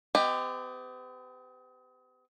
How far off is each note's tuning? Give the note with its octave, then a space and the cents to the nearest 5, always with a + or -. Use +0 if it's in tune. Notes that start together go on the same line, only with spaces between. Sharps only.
B3 +45 G4 +15 D#5 +0